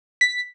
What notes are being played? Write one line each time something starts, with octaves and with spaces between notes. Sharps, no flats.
B6